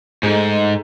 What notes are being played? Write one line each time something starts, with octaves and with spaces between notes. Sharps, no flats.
G#2 A3 D#4 G#4